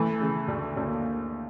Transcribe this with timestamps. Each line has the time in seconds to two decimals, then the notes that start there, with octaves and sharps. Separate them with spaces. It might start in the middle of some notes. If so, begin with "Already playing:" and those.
Already playing: E3 A3
0.21 C#3
0.48 D2
0.76 D2 C#4
0.87 A#3